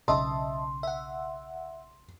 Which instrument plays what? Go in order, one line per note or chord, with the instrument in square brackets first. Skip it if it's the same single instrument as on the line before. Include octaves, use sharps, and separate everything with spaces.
[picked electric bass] B1 C#3 [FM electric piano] D#5 E5 A5 [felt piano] C6
[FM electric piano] E5 F#5